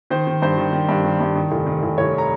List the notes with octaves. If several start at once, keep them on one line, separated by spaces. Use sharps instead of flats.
D#3 C5
D#3
G2 C5
D#3
D#3
G2
D#3
G2
D#3
F1
D#3
F1
F1 C#5
A#5